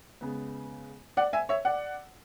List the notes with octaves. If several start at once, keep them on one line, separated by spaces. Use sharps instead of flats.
C#3 G#3 B3
D5 F#5
E5 G#5
C#5 E5
D5 F#5